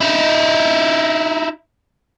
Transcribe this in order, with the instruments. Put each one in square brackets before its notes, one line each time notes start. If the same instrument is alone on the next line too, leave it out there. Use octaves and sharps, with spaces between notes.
[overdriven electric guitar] D#4 E4